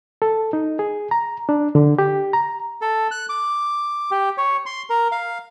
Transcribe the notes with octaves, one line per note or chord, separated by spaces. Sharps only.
A4
D#4
G#4
A#5
D4
D3
G4
A#5
A4
F#6
D6
G4
C#5
C6
A#4
F5